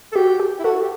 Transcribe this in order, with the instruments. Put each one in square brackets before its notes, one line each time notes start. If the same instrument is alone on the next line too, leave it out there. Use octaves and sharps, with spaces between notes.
[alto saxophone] A4
[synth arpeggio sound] F#4 [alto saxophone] G4
[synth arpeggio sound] G4
[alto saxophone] E4
[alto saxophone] F#4 [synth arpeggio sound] A4
[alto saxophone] G4